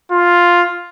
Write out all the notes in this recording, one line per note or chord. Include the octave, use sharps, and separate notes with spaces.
F4